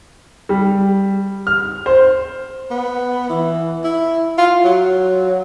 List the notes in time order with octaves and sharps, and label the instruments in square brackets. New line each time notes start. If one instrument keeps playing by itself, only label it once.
[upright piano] G3
F6
C5
[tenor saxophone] B3
E3
E4
F4
F#3